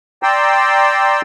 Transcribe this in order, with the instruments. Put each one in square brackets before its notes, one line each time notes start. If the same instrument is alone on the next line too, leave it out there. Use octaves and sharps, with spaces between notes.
[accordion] D5 G5 A#5 C6 E6